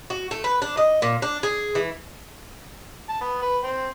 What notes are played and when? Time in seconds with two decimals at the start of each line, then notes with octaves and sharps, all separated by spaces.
0.10 F#4
0.31 A3
0.44 B4
0.62 D4
0.77 D#5
1.02 A#2
1.22 D4
1.43 G#4
1.75 E3
3.09 A5
3.22 B3
3.42 B4
3.64 C4